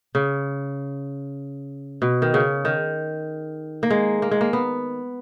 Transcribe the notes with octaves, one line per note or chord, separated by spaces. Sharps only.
C#3
B2
D#3
C#3
D#3
A#3
G#3
A#3
G#3
A#3
B3